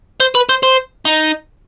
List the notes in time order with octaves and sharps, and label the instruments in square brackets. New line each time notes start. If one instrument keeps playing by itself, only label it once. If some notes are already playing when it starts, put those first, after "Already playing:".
[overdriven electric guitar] C5
B4
C5
C5
D#4